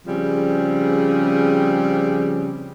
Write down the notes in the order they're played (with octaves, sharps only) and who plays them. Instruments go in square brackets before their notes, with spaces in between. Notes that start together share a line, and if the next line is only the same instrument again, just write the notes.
[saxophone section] C#3 F3 G3 C4 G#4